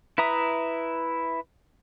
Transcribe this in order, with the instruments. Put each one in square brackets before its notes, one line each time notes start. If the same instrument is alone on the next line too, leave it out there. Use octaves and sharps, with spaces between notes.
[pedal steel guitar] E4 B4 E5 A#5 D#6